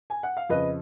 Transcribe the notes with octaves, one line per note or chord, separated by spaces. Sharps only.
G#5
F#5
F5
F2 C#3 B4 D#5